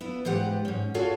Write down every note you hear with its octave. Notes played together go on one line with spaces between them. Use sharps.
B3 E4 F4
G#2 E3 G#3 F4 G4 F#5
G#2 C#4
F4 F#4 G#4 A4 C#5 F5